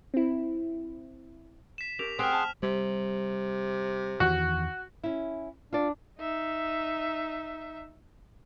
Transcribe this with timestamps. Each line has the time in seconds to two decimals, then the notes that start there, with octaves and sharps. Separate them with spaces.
0.14 C4 E4
1.78 B6 E7
1.99 C#4 G4 A#4 F7
2.19 C4 G#4 F#5 C6 F6 F7
2.33 A5
2.63 C3 G3
4.20 E2 D#3 E3 F#4
5.04 C#4 E4
5.73 D4 F4 D5
6.19 D#4 E5